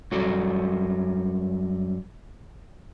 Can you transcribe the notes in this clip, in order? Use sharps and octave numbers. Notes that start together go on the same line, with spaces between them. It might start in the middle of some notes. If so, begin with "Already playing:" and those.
F#2 G3 F#4 A4